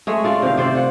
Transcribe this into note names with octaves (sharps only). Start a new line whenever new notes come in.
G#3 A3 C#5
A3 D4 F4 D5
C3 D#3 F5
C3 C5 D5
F4 F#5